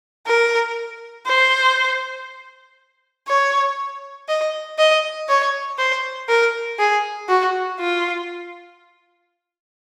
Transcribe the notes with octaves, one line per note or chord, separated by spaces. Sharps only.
A#4
C5
C#5
D#5
D#5
C#5
C5
A#4
G#4
F#4
F4